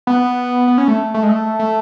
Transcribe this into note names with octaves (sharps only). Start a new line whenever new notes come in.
B3
B3
C#4
A3
A3
G#3
A3
A3